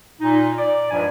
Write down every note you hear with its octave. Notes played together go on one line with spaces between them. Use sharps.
A#2 D#4
D5
C#2 G2 F3 G#5